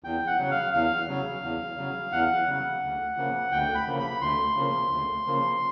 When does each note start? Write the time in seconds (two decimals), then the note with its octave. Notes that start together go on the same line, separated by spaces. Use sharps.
0.04 E2 G5
0.27 F#5
0.38 C#3 F#3
0.51 F5
0.73 E2 F5
1.08 C#3 F#3
1.44 E2
1.77 C#3 F#3
2.12 E2 F#5
2.48 C#3 F#3
2.83 D2
3.17 C#3 F3 A#3
3.52 D2 G5
3.75 B5
3.87 C#3 F3 A#3
3.99 B5
4.22 D2 C6
4.56 C#3 F3 A#3
4.91 D2
5.26 C#3 F3 A#3